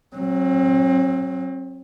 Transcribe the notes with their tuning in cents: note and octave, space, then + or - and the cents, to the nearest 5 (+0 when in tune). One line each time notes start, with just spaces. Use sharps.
F#3 +0 C4 +35